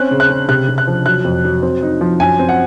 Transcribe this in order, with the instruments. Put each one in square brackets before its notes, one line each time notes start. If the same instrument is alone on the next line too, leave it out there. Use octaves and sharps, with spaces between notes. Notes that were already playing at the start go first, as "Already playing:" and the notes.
Already playing: [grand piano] C4 C#4 F#6
C#3
F#6
C#3
C3 F#6
C3
F#6
F3
F#3 F#6
F2
F#3
C4
D#4
F3
F#2 G#5
C4
F#5